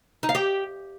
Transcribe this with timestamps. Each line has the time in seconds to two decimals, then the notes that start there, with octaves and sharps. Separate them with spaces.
0.23 D#4
0.29 F5
0.35 G4